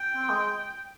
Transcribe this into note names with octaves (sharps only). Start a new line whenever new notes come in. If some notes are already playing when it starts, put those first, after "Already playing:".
Already playing: G5
C4
G#3